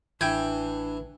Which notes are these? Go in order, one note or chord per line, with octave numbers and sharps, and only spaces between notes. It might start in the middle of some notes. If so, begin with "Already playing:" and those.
A1 E3 D4 G5 G6 G#6